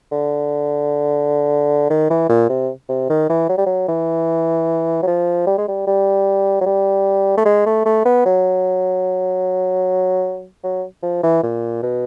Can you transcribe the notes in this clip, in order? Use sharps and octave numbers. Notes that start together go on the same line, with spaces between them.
D3
D#3
E3
A#2
C3
C3
D#3
E3
F#3
G3
F#3
E3
F#3
F3
G3
G#3
G3
G3
F#3
G3
A3
G#3
A3
A3
B3
F#3
F#3
F3
E3
A#2
B2